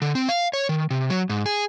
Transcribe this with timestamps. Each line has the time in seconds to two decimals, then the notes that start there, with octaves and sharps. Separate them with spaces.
0.02 D3
0.15 C4
0.29 F5
0.53 C#5
0.69 D#3
0.90 C3
1.10 F#3
1.29 G#2
1.46 G#4